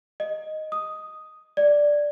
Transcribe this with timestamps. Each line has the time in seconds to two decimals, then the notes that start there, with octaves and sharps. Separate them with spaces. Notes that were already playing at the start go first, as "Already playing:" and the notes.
0.20 D#5
0.72 D#6
1.57 D5